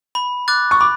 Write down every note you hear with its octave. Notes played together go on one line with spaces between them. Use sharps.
B5
D6 F#6 A6
C#6
B5 D6